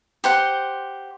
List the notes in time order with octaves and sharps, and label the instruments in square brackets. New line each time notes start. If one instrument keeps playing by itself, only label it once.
[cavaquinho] G4 C5 F#5